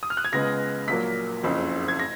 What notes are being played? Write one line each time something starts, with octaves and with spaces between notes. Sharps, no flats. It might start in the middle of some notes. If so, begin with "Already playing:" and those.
D#6
F6
F#6
G#6
C#2 C#3 G#3 B3 A#6
A#1 A#2 F#3 A#3 B6
F#1 F2 C#3
G#6
A#6